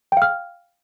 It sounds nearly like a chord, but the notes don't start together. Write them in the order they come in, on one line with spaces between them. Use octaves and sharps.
G5 F5 F6